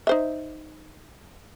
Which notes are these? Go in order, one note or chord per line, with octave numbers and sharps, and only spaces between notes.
D#4 C5 E5